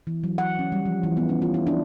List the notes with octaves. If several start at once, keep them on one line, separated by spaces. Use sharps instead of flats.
E3
F#3
F#5
C#4
G3
F3
E3
B3
C#4
F4
E4
D4